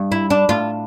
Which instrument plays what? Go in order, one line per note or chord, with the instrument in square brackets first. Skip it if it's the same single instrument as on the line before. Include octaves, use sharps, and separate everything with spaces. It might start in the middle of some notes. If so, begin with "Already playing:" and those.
Already playing: [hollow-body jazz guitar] G2
[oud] E4
D4
[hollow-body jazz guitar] A2 [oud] F4